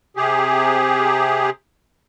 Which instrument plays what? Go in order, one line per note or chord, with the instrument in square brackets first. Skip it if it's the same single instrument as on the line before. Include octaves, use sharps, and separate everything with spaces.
[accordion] C3 G4 G#4